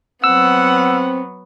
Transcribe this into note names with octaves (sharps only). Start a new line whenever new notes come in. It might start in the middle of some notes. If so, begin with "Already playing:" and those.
F#3 B3 C4 F#5 E6